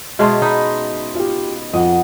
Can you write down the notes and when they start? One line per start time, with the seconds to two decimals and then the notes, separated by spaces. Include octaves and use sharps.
0.19 B2 G#3 C#4 E5 A5 C6
0.42 D#4 D#5 B5
1.15 F4 G4
1.73 F2 D#5 F#5